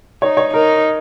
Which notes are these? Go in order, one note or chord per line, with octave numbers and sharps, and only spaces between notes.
D#4 C#5
C#5
D#4 A#4